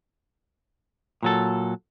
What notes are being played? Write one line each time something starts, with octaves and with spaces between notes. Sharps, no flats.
A#2 F#3 A4